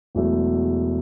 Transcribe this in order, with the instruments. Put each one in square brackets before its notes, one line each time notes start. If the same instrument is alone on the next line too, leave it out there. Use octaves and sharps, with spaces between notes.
[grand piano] E1 E2 B2 F#3 A3